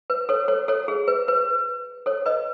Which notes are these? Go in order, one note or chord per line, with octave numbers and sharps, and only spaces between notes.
B4
A4 C#5
A4 C#5
A4 C#5
G#4
B4
B4
A4 C#5
B4 D#5